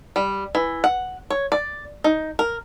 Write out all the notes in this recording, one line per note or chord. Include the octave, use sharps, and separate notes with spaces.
G3
E3
F#5
C#5
D5
D#4
A#4